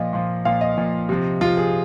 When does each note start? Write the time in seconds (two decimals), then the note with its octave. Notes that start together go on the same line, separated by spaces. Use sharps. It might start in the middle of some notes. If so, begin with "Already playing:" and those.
Already playing: A#2 F3 D#5
0.13 A#2 F3
0.45 A#2 F3 F5
0.61 D#5
0.77 A#2 F3
1.09 C3 F3
1.41 C3 F3 F4
1.57 G#4